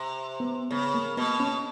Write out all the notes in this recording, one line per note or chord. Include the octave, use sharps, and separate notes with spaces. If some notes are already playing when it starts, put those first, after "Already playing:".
Already playing: C3
B3
C#3 B3
A#3
B2 B3
C#4